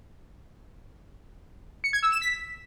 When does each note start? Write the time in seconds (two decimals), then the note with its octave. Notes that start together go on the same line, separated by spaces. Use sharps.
1.84 C#7
1.93 G#6
2.03 E6
2.12 E7
2.21 B6